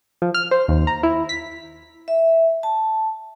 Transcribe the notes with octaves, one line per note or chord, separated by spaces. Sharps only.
F3
F6
C5
D#2
A#5
E4
B6
E5
A5